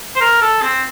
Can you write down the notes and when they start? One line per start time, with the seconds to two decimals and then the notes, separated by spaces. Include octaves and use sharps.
0.16 C5
0.21 A#4
0.41 A4
0.62 C4